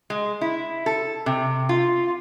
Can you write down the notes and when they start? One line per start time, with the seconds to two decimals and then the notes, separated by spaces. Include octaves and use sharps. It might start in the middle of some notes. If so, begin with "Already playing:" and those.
0.10 G#3
0.41 E4
0.86 A4
1.26 C3
1.69 F4